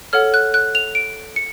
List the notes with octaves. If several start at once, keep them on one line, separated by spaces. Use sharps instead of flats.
A4 C#5 F#5 F6
F#6
F#6
F7
D7
C#7